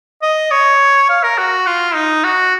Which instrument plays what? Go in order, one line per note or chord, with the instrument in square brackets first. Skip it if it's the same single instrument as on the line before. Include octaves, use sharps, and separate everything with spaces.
[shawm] D#5
C#5
F5
A#4
F#4
F4
D#4
F#4